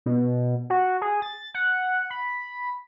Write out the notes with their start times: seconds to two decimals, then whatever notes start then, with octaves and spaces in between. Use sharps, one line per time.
0.06 B2
0.70 F#4
1.01 G#4
1.22 A6
1.54 F#5
2.10 B5